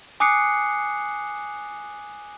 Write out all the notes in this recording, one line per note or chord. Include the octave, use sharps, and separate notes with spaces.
G#5 D6 D#6 F#6 C7 C#7